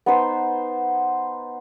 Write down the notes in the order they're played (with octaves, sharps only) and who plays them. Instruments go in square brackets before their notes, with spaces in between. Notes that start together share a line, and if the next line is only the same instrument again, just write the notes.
[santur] B3 D#4 C5